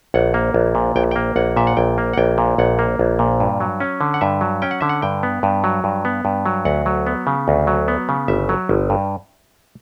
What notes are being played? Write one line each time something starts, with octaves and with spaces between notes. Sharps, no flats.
A#1 F#5
A#3
A#1
A#2
A#1 G5
A#3 G5
A#1 F#5
A#2 E5
F#5
A#1 G5
A#3
F#5
A#1 G5
A#2
A#1 F#5
A#3
A#1
A#2
G2
F#3
C#4
D3
F#5
G2 E5
F#3
C#4 G5
F#5
D3 E5
F#5
G2 G5
B3
G2
F#3
G2
B3
G2
F#3
D2 F#5
F#3
B3
C#3
D2
F#3
B3
C#3
G1 E5
F#3
G1
G2